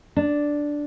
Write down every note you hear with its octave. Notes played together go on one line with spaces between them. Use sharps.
D4